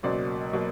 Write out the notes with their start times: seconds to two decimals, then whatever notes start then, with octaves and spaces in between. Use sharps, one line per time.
0.03 C#2 B2 F#3 A#3 C5 D5
0.53 B2 F#3 A#3